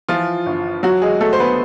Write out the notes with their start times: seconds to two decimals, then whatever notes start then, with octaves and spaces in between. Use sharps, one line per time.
0.08 E3 F3 F4
0.46 G1
0.83 F#3 F#4
1.02 G#3 G#4
1.21 F#3 A3 A4
1.33 C5
1.40 B3 B4